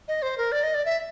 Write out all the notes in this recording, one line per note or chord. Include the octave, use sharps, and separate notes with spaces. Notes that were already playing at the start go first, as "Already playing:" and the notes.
D#5
C5
A#4
D5
D#5
D5
E5